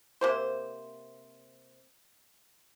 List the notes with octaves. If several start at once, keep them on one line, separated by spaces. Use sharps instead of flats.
C3 A#3 C5